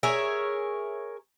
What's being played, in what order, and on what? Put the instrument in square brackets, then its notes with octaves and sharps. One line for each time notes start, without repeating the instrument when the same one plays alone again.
[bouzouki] G#4 A#4 C#5 E5